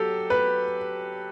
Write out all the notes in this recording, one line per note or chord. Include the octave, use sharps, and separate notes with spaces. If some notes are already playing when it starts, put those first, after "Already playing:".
Already playing: F#3 G4 A4
B4